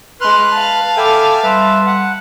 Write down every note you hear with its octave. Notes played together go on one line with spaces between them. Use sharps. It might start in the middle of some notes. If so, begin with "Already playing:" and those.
G#3 B4 C6 F6 F#6
F5 A5
A4 E5 G5 G#5 B5 D6
G3 B4 E5 C6
F#5